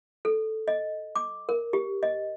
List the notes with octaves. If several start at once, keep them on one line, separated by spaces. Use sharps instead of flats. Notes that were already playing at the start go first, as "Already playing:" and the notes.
A4
D#5
D6
A#4
G4
D#5